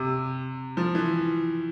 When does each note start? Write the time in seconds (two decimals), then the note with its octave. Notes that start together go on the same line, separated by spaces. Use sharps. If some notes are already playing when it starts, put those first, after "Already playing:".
Already playing: C3
0.77 F3
0.95 E3